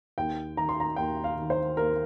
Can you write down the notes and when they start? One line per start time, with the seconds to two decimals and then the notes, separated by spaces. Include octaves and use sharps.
0.18 D#2 G5
0.57 D#3 A#5
0.69 C6
0.80 A#5
0.96 D#2 G5
1.24 F5
1.37 D#3
1.50 C5
1.77 D#2 A#4